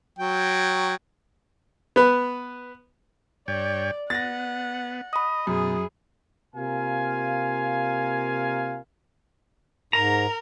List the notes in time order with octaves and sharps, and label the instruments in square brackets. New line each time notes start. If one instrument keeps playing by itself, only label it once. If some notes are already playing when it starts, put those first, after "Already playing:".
[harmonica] F#3 G5
[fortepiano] B3 B4
[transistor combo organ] G2 C#5 G5 [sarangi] D5
[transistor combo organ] B3 [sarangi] F#5 [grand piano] A6 A#6
[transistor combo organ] D#5 [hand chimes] B5 D#6
[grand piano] F#2 [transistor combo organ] B2 [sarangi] G#4
[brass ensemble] C3 A#3 F4 A#4 F5 G#5
[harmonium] G#2 [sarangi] A#4 [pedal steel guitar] A#5